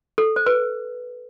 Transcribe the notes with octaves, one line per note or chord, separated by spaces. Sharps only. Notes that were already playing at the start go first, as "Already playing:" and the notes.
A4
C5
B4